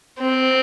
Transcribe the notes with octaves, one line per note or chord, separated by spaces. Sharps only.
C4